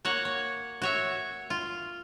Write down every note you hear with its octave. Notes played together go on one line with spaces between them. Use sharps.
A#3 F#4 C#5 F#5
C#5
F#4 C#5 E5
F4